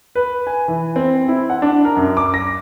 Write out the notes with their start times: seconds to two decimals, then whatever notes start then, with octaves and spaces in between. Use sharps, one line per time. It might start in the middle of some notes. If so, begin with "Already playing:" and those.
0.15 B4
0.47 G#5
0.68 E3
0.96 C4
1.28 E4
1.50 F#5
1.62 D4
1.85 A#4
1.97 F#2
2.17 D6
2.34 A#6